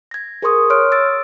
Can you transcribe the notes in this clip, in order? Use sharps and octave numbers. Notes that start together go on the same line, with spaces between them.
G#6 A#6
G#4 A#4 C5 C6 C#6 D#6
C#5 C6 F6 F#6 D7
E6 A6 D7